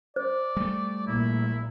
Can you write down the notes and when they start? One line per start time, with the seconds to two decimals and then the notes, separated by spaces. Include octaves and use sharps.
0.16 C5 D5
0.57 G3 A3
1.06 A#1 A#2 E4